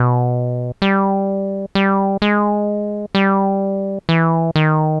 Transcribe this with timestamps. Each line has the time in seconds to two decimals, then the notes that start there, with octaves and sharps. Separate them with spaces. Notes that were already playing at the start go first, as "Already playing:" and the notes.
Already playing: B2
0.82 G3
1.75 G3
2.22 G#3
3.15 G3
4.09 E3
4.56 D#3